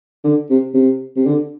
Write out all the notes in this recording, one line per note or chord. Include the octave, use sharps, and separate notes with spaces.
D3
C3
C3
C3
D3